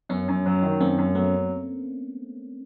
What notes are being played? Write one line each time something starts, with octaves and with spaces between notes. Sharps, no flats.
F#2 B3 C#4
F#2
F#3
D#3
F#2 A#3 C4
F#2
F#3 A3 B3